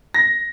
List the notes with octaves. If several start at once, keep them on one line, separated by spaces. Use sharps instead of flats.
A#6